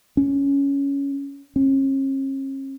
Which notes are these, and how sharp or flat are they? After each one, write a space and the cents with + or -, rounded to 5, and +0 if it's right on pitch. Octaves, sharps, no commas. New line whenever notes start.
C#4 +10
C#4 -40